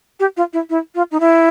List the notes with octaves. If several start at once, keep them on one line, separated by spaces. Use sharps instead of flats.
G4
F4
E4
E4
F4
D#4
E4